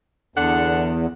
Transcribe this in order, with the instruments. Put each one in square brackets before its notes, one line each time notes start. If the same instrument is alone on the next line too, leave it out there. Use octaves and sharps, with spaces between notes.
[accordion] E2 [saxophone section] D3 D4 F#5